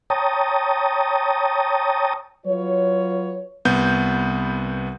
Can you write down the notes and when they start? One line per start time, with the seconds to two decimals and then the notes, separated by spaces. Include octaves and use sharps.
0.10 C#5 G5 A5 A#5 D#6
2.46 F#3 F4 F#4 B4 C#5
3.65 C2 B3 G6